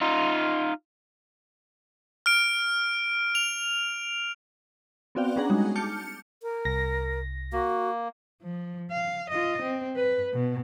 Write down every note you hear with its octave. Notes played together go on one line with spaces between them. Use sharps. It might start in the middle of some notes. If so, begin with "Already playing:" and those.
D#4 F4
F6 D7
F7
B3 C4 F#4 D5 F5 G5
B3 C#4 D4 G#4 F#5 A#5
G3 G#3 D#4 F#4 G#4
A5 D6 F6 G6 C#7
A#4
C2 A#6
A#3 F#4
F3
F5
F4 D#5
C4
B4
B2